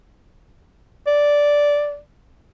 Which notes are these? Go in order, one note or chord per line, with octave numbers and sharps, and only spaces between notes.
D5